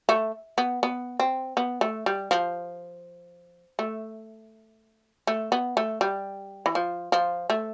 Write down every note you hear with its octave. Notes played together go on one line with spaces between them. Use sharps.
A3
B3
B3
C4
B3
A3
G3
F3
A3
A3
B3
A3
G3
E3
F3
F3
A3